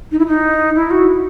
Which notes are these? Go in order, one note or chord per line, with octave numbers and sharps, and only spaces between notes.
D#4
E4
D#4
E4
F#4